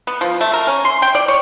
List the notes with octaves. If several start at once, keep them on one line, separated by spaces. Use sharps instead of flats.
B3
F3
A3
A#4
C#4
C6
G5
D5
C#5